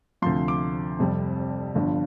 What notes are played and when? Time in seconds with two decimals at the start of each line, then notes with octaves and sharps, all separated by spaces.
0.22 D2 C3 F3 C6
0.48 D6
0.99 F1 F2 C3 G3
1.75 G1 G2 D3 F3